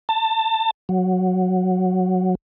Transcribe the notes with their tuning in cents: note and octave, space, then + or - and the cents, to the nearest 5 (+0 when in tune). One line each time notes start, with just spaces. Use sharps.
A5 +25
F#3 -5